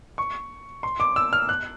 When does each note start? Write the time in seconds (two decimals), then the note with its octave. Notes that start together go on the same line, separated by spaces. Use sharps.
0.18 C#6
0.83 C6
1.00 D6
1.16 E6
1.33 F6
1.49 F#6